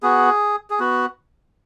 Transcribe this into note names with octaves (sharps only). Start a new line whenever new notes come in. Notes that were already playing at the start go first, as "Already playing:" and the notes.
B3 F#4 G#4
G#4
B3 F#4